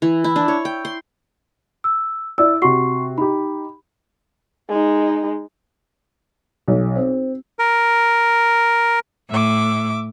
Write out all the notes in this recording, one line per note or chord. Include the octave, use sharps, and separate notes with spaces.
E3
E4
D4
C#5
G5
C6
E6
E4 D5 E6
C3 F#4 C6 C#6 C7
D#4 G4 B5
G#3 D#4
B1
C4
A#4
A2 E5 D6